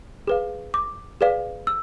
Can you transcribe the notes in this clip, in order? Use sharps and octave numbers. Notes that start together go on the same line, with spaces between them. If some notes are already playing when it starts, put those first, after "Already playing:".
G#4 B4 F5
D6
G#4 B4 D5 F5
E6